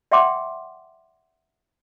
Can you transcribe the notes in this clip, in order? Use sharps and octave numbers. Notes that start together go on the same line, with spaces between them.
D5 E5 F#5 G5 C6 D6